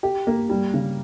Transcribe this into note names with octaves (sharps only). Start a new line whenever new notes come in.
G4
A#3
G3
C#3